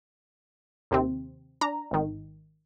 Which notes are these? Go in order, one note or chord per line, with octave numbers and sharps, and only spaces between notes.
D#2 C3 C4
D4 A#5
G#1 D#3